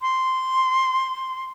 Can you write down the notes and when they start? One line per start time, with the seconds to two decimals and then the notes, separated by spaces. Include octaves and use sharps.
0.02 C6